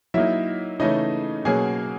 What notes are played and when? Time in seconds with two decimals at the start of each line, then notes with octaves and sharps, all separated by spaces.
0.14 F#3 A#3 D#4 E4 E5
0.80 C#3 E3 A3 C#4 D#4 D#5
1.45 B2 F#3 A#3 C#4 G#4 G#5